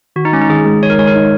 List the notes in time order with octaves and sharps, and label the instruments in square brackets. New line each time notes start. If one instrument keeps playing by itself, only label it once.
[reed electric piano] D#3 [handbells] F#4
[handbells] D#4
[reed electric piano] G#3 [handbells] C#4
[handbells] D#4
[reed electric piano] D#3 [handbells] G#4
[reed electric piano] G#3
[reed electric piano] D#4 [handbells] C#5
[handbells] A#4
[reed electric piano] G#3 [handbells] C#5
[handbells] A#4
[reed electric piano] D#4